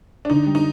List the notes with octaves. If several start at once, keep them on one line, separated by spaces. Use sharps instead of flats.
D4
D3 D#4
G3
D#4